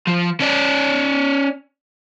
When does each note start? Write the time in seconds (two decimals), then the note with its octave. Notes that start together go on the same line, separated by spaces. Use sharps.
0.07 F3
0.40 C#4 D5